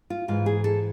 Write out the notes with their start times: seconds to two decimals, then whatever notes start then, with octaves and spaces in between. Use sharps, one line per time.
0.10 F4
0.28 G#2 E3 F4
0.46 G#4
0.64 A4